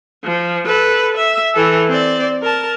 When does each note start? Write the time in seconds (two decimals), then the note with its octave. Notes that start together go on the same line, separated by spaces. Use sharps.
0.25 F3
0.66 A4 B4
1.17 E5
1.54 E3 A4
1.88 C4 D5
2.42 A#4 A5